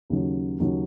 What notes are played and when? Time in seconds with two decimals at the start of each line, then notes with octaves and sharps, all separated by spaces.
0.10 D#2 C#3 F#3 C#4
0.60 D#2 C#3 F#3 C#4